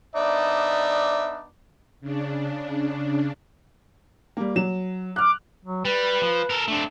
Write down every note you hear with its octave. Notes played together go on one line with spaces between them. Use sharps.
B3 D4 D#4 D5 E5
C#3 D4
G3 A#3
F#3 E7
D6 F6 F#6
F#3
G3 B4
F3
A4 A#4
A3 C4 D4